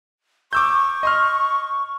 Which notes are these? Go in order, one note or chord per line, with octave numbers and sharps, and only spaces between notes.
C#6 D6 E6 G6
D#5 C6 F6